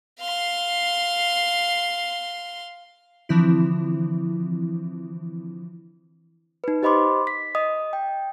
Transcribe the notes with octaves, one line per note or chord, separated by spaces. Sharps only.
F5 C6
D3 E3 F3 C4 E4
D#4 B4
G4 C5 D#5 B5 C6 D6
B6
D#5 D#6
G5